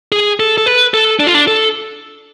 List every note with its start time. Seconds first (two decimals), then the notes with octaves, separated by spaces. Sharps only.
0.12 G#4
0.40 A4
0.58 A4
0.66 B4
0.94 A4
1.20 D4
1.27 F4
1.34 D4
1.47 A4